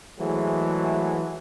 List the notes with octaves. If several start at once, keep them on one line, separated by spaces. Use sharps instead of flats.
E3 F#3 G#3 A3 G#4 C5